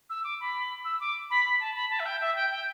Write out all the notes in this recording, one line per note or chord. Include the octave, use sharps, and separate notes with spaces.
E6
D6
B5
E6
D6
B5
B5
A5
B5
A5
E5
G5
E5
G5
G5